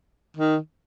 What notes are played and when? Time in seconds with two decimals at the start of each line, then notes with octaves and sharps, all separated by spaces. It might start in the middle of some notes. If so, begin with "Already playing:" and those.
0.37 D#3